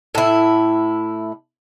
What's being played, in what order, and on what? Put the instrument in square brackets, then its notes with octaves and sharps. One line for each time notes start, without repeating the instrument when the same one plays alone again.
[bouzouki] A2 E4